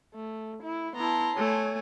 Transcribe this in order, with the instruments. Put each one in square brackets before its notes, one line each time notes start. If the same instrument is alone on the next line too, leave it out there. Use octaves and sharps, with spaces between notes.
[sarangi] A3
E4
[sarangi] B3 [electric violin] E4 A#5 [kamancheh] A5 C6
[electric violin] A3 G#5 [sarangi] C#5